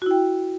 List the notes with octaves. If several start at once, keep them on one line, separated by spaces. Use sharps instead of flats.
E4 F#4 G5